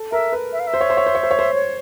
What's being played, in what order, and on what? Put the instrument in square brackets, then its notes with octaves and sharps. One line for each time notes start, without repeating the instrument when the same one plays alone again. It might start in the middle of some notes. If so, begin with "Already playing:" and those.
Already playing: [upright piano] A4
[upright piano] A#4 [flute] E5
[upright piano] B4
[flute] E5
F5
E5
[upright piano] C5
C#5
C5
C#5
C5
C#5
C5
C#5
C5
[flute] C#5